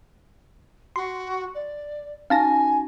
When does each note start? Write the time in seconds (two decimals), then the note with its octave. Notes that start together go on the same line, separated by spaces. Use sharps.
0.96 F#4 C6
1.54 D5
2.30 C#4 D#4 F#4 F5 G#5 A5 A#6